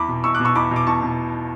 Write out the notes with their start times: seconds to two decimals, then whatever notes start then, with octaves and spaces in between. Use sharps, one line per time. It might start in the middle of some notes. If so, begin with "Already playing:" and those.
Already playing: E2 B5 D6
0.09 B2
0.24 E2 C#6 E6
0.35 D6 F#6
0.40 B2
0.45 C#6 E6
0.55 E2 B5 D6
0.71 B2
0.76 D6
0.87 E2 A5 C#6
1.02 B2